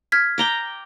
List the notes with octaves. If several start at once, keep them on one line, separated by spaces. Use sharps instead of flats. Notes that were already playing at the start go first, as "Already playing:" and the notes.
F6 G#6 B6
G5 A#5 D6